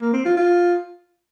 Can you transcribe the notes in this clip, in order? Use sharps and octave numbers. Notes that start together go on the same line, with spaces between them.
A#3
C4
F4
F4